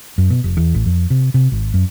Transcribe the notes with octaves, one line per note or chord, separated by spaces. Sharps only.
F#2
B2
F1
E2
A1
F2
C3
C3
G#1
F#2